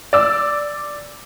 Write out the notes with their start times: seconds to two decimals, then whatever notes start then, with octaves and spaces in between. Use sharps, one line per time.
0.13 D5 E6